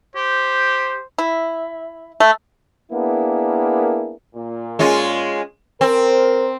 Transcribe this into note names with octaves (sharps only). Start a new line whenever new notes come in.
G4 C5
E4
A3
A#3 B3 D4 E4 G#4 A#4
A#2
G#3 C#4 F4
C4 A#4